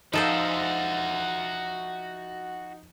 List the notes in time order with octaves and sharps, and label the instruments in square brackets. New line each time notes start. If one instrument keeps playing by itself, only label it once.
[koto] F3 A4 C5 [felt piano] D#4 [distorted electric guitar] F#4 E5